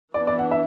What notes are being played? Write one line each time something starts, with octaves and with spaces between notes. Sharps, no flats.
E3 B3 D4 D5
D5
F#5
E5